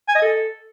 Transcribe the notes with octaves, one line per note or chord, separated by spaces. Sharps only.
G#5
D#5
A4